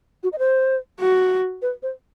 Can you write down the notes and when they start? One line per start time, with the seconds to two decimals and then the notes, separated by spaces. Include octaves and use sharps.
0.23 F#4
0.33 D#5
0.39 C5
1.00 F#4
1.62 B4
1.82 C5